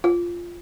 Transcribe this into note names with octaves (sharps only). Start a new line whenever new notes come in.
F4